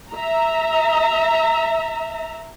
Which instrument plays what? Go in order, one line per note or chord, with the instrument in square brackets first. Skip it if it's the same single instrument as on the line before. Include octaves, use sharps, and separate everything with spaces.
[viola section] E5 A#5